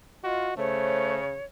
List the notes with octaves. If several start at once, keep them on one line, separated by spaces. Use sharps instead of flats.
F4 F#4 D#5
C#3 A3 C5 C#5